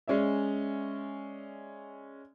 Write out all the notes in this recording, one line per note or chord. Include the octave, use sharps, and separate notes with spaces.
G#3 C#4 D5 E5